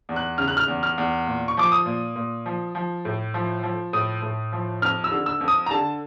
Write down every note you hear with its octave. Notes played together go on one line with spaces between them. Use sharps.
E2
F#6
C#3 F6
F#6
F6
E2
F6
E2
A#2
C#6
F3 D6
D#6
A#2
A#2
F3
F3
A2
F3
F3
A2 D#6
A2
F3
F2 F6
E6
D3
E6
F2
D#6
A#5
D3 A5